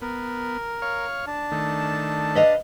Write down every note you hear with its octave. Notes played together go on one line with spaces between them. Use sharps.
B3 A#4
C#5 F5
D4 A5
D#3 A3
B4 D#5 F5